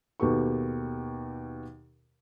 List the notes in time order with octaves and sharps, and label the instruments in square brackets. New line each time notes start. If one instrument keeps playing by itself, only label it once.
[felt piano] D#2 B2 B3 G4 A4 C#6